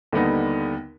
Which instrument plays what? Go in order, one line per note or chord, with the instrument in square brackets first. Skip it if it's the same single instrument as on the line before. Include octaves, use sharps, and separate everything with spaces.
[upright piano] D#2 D3 G3 B3 D#4